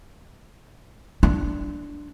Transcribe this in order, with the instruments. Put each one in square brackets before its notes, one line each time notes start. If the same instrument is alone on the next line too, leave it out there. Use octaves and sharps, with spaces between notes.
[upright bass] D4